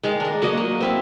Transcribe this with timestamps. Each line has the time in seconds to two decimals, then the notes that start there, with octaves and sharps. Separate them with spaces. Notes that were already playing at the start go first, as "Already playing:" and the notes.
0.03 D#3 G#3 F5
0.20 D4 A#4
0.42 F#3 A#3 F#4 D#5
0.57 A#3
0.81 C4 E4 F5